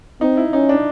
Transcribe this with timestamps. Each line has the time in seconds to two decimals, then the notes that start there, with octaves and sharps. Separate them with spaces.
0.21 C4 D#4
0.37 E4
0.53 C#4 D#4
0.69 D4